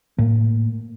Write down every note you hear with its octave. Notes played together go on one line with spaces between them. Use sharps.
A2 A#3